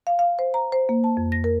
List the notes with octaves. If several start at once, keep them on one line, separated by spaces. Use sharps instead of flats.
F5
F5
C5
A#5
C5
A#3
A5
F2
A#6
A#4